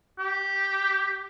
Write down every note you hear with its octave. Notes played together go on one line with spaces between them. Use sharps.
G4